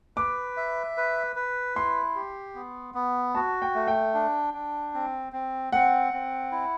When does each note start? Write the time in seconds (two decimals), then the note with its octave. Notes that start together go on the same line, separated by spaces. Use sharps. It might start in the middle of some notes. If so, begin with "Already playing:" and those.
0.17 B4 D6
0.57 E5
0.97 B4
1.36 B4
1.75 E4 C6
2.15 G4
2.55 B3
2.94 B3
3.35 F#4 A5
3.62 G5
3.75 A3
3.88 G5
4.14 D4
4.54 D4
4.94 C4
5.33 C4
5.72 C4 F#5
6.13 C4
6.52 E4